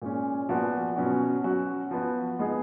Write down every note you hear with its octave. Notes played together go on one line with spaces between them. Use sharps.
A#2 G#3 C#4
A#2 F3 B3 F#4
B2 F#3 C#4 F#4
F#3 C#4 F#4
F3 B3 F#4
G#3 B3 D#4 G#4